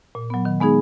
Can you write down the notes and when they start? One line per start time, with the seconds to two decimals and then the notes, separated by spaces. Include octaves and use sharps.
0.15 A#2
0.30 F#3 B3
0.45 D#3
0.60 G#3 B3 D#4 G#4